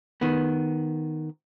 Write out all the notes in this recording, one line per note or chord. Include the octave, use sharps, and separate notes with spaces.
D#3 B3